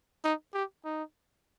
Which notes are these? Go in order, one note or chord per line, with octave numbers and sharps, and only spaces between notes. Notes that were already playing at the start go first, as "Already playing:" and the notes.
D#4
G4
D#4